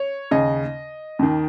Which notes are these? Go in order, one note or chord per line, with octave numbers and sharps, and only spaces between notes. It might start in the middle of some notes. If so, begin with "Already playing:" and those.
Already playing: C#5
D#2 C#3 D#5
D#2 D#3